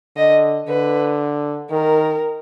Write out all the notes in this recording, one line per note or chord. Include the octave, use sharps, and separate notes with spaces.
D3 D#5
D3 B4
D#3 A#4